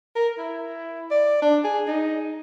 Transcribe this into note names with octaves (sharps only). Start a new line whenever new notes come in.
A#4
E4
D5
D4
G#4
D#4